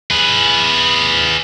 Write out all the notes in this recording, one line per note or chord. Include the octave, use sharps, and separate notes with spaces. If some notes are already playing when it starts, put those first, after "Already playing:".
G#4 B4